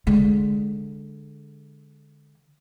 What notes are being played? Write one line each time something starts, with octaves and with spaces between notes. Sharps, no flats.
D3 G#3